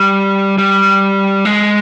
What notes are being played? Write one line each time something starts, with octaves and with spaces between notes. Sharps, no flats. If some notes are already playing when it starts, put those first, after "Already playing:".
Already playing: G3
G3
G#3